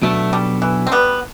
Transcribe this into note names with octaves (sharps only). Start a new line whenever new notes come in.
B2 F#3 A3 B3 D4 A4
G3
E3
C4
G3 B3